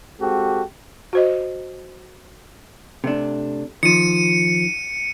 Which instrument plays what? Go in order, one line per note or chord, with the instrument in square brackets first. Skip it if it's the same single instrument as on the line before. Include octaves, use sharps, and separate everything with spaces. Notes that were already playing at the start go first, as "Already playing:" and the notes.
[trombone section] G#3 C4 F#4 G4 A4
[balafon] F#4 C5 D#5
[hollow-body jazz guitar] C3 A3 D4
[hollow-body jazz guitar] D#3 F3 [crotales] C#7 D#7